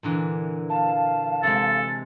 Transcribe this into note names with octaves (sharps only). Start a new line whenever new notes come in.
A#2 D3 E3
F5 A5
C3 G#3 A4